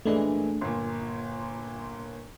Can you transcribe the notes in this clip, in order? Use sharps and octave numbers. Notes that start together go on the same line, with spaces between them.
A#2 E3 G#3 A3 D4 G#4
G1 A#2 C6